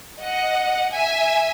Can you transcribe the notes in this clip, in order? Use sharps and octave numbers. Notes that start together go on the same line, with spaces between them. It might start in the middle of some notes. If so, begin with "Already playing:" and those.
D#5 F#5
E5 G#5